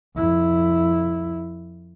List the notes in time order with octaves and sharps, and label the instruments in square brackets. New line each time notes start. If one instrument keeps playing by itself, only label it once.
[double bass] F2 E4